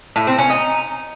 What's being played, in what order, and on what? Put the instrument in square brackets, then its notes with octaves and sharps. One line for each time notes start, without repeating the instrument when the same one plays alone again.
[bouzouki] A2
C4
C#4
D#4